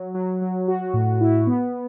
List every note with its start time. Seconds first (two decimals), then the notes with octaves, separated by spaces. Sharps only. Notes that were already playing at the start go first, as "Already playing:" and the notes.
Already playing: F#3
0.14 F#3
0.41 F#3
0.68 F#4
0.94 A2
1.21 E4
1.47 B3